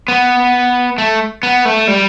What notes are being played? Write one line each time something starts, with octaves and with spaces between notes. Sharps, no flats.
B3
A3
B3
A3
G3